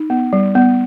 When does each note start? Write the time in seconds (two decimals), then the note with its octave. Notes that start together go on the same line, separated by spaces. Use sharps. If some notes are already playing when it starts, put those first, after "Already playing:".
Already playing: D#4
0.10 B3
0.33 G3
0.55 B3